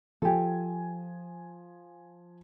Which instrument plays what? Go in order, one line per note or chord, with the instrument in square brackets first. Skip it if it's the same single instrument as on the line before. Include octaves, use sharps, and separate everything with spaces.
[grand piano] F3 G#5 [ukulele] G4 A4